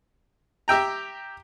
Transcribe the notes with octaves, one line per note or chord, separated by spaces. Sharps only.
G4 E5 G5 A#5